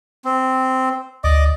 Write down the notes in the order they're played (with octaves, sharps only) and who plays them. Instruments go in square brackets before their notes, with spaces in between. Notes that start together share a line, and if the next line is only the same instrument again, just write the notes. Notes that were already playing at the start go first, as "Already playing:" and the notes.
[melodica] C4
[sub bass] D2 [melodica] D5 D#5 D6